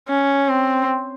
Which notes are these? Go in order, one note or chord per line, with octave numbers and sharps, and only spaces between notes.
C#4
C4